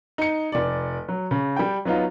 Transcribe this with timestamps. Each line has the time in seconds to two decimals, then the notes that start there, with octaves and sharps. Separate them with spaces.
0.18 D#4 C#7
0.52 F1 D5
1.09 F#3
1.31 C#3
1.56 G3 G5
1.85 F#3 B3 D#4 F4